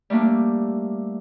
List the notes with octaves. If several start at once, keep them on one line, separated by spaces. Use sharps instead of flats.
G3 A3 A#3 D4